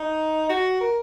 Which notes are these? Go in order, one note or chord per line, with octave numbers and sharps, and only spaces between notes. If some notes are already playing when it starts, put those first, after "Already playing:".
Already playing: D#4
F#4
A#4